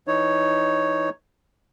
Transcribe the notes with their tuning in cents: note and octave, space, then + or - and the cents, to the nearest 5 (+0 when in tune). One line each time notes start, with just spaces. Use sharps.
E3 +0 D#4 +0 C#5 +0